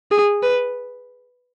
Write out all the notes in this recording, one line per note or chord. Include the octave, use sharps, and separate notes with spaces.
G#4
B4